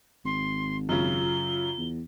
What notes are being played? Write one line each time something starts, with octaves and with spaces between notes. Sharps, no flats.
G#1 C6
F#2 C#3 F4 G7
E2